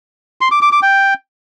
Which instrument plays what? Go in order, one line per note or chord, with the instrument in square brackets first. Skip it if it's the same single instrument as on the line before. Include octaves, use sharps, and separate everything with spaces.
[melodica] C6
D6
D6
D6
G5